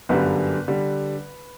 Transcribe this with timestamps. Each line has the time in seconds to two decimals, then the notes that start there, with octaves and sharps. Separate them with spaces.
0.09 G1 F#2 D3 G3 B4
0.68 D3 G3